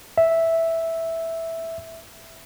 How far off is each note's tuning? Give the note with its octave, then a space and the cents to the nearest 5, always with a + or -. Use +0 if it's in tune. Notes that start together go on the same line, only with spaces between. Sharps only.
E5 -5